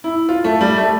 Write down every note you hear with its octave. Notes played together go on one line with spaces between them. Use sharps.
E4
F4
A3
G3
A3